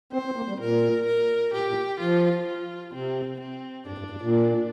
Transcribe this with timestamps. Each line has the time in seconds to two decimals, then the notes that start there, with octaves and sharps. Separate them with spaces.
0.13 C4 C5
0.25 C4
0.36 A#3
0.48 G3
0.60 A#2 A#4
1.07 A#4
1.54 A#2 G4
1.68 A#2
2.00 F3 F4
2.47 F4
2.93 C3 C4
3.40 C4
3.87 G2 D4
3.98 G2
4.10 G2
4.22 A#2